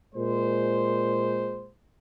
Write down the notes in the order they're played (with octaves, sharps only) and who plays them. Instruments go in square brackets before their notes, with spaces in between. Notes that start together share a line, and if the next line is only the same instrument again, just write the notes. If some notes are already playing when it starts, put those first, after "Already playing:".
[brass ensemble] A#2 G#3 C5